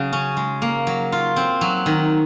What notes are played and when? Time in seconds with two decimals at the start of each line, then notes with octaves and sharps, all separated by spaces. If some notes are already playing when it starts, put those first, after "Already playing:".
Already playing: C#3 F#3
0.13 C#4
0.37 G#3
0.62 A#3
0.87 F#3
1.12 F4
1.36 C4
1.61 F#3
1.86 D#3